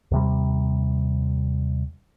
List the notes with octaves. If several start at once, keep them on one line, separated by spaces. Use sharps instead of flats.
D#2 C3 G3